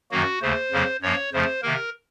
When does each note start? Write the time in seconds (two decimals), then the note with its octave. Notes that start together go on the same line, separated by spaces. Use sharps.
0.11 F#2 D#3 F#3 A#3 F#4
0.42 D#2 C#3 A3 C5
0.72 F2 C#3 F#3 A#3
1.02 F#2 F3 A#3 C#5
1.33 F2 C#3 F3 A3 C5
1.62 C3 D#3 A#3 A#4